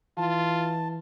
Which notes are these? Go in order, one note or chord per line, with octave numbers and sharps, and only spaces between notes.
E3 F4 A5